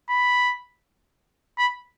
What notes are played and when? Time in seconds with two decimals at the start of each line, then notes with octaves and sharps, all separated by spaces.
0.09 B5
1.58 B5